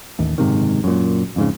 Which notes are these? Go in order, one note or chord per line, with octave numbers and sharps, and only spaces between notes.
A1 D#2
F#1 G#2 C3 D#3
F#2 A#2
F2 G#2 C#3